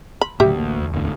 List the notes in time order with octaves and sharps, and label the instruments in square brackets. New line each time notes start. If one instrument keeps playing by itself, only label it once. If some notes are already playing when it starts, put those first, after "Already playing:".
[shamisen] B5
[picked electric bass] D2 [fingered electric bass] A2 C#3 F#3 [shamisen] G4 E5
[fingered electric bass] A1 A#3
E2
[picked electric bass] D1 G1 D2